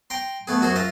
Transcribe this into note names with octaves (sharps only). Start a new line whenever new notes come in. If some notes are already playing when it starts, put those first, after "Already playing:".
G5 A#5 C6
A3 B3 G#4
F#2 F#4 G#4 C5
F4 E5 A#5